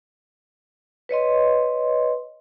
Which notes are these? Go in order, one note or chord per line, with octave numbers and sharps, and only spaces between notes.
B4 C#5 D#5 C6